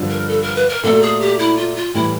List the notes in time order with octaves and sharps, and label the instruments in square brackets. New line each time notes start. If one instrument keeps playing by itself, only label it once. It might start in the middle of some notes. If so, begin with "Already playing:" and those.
Already playing: [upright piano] G2 D3 F3
[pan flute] A#4
A4
A#4
B4
A#4
[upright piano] A#2 F#3 A3 [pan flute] A4
[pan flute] G#4
G4
E4
F4
F4
[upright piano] A2 E3 G3 [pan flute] E4